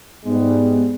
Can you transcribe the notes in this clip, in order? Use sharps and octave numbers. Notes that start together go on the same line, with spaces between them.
G#2 G3 G#3 B3